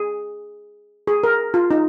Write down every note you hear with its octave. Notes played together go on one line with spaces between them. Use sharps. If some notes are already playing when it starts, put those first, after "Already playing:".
Already playing: G#4
G#4
A#4
F4
D#4